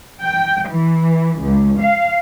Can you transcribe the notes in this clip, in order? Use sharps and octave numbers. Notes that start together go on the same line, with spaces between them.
G5
E3
C#2
F5